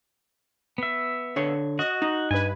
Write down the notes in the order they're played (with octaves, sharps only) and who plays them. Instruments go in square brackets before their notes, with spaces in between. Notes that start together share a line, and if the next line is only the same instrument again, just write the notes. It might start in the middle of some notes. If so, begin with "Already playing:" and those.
[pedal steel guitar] B3 E5
[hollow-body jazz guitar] D3 C#5
[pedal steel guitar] F#4 [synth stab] D#5
[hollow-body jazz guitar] D#4
[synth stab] G2 B4 [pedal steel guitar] G#5